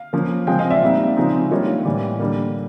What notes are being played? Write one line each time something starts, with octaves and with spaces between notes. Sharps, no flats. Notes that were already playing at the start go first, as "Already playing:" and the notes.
Already playing: F5
F3 A#3 C#4 F4
C#3 F3 G#3 C4 F5 G5
D#5 F5
D5 E5
A#2 G3 C4 D#4
C#3 F3 G#3 C4 D#4
D#3 G3 A#3 D4 F4 C#5 D#5
A2 E3 G3
D3 G3 A#3